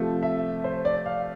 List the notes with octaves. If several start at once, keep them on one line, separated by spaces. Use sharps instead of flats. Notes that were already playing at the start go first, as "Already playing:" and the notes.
Already playing: C3 F3 A3
E5
C5
D5
F5